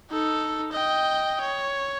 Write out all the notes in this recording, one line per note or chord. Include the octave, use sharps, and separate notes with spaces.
D#4 A4
D#5 G5
C#5